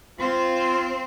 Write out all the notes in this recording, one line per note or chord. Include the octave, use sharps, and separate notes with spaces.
C4 F4 C5